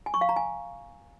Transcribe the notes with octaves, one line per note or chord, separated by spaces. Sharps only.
G#5
C#6
F5
A#5
G#5